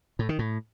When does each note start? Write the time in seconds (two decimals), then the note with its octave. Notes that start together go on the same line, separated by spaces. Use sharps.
0.19 A2
0.29 D#3
0.39 A2